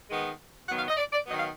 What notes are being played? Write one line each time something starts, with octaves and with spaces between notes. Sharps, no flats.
D#3 G#3 B3
D#3 F#3 B3 F#5
F5
D#5
D5
D5
D#3 F#3 B3 D#5
F5